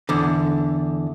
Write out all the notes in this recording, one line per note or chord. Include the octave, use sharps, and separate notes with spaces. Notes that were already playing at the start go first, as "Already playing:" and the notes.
E2 D3